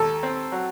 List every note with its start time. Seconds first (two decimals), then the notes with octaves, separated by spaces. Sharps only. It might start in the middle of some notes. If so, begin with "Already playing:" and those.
Already playing: D#2 A4
0.23 C4
0.52 F#3